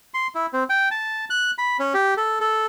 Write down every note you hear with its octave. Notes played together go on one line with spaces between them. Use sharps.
C6
E4
C4
G5
A5
F#6
B5
C#4
G4
A4
A4